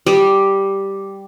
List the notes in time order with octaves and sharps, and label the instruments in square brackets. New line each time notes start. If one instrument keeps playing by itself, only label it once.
[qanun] G3